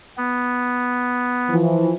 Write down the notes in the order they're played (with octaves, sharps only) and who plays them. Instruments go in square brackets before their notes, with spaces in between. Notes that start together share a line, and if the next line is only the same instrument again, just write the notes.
[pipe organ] B3
[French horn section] E3 F3